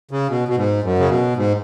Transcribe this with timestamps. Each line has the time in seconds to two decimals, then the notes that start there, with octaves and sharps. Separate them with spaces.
0.11 C#3
0.30 B2
0.48 B2
0.56 G#2
0.84 F#2
0.99 C#3
1.09 B2
1.37 G#2